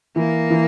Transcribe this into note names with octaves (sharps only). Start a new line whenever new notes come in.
E3 A#3
E3